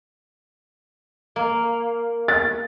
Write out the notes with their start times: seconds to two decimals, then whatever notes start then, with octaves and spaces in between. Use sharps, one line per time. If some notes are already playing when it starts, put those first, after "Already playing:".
1.36 A#3
2.28 A6